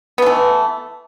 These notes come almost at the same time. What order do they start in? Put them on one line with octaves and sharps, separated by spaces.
B3 A3 E3